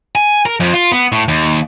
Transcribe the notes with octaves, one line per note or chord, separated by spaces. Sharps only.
G#5
A#4
F2
F4
B3
A2
D#2